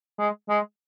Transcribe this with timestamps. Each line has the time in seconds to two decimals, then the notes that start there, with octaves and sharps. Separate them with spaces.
0.19 G#3
0.49 G#3